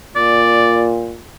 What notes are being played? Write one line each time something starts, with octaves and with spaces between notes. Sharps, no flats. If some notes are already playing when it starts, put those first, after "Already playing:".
A#2 D5